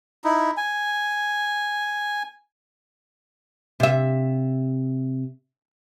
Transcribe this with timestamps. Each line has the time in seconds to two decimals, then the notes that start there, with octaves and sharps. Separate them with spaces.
0.24 D#4 E4
0.57 G#5
3.80 C3 E5